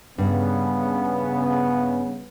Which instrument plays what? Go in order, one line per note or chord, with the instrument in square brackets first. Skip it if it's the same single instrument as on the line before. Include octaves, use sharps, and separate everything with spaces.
[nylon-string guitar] G2 [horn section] C#3 B3